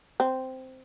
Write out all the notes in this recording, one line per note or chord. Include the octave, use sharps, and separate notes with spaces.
C4